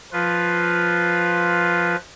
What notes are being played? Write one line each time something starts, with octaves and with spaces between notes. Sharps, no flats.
F3 F4 B4